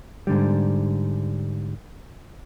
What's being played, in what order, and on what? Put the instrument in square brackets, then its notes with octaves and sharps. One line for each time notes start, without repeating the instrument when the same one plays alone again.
[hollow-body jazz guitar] G#2 D3 G3